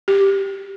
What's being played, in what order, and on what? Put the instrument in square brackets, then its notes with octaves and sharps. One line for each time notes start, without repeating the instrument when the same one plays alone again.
[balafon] G4